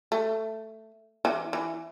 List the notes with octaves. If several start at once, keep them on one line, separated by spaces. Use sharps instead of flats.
A3
E3
E3